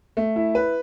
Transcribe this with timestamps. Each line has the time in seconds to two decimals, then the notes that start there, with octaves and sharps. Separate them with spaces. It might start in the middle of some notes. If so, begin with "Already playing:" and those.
0.17 A3
0.36 E4
0.55 B4